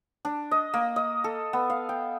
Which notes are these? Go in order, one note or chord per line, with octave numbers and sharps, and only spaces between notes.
D4
D#5
A#3
D#5
A4
B3
F5
G5